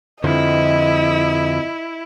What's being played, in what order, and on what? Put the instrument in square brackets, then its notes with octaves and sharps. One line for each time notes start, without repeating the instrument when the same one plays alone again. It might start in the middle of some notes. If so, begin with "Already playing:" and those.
[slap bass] F2 D3 F3 [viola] E4 [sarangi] D#5